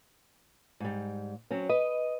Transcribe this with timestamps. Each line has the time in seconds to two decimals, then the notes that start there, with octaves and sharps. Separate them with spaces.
0.80 G#2 G3
1.51 F#3 C4 C#4
1.70 B4 D#5